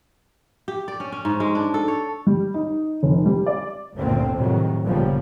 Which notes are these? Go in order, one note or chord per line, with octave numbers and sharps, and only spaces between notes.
G4
D5
C#4
C#4
G#2
G#3
D4
A4
C#5
G3
D#4
F1
G3
D5
G1 D2 A#2 D3 C4
F2 A2 C3 D#3 F#3
G1 G2 A#2 C#3 F3 G3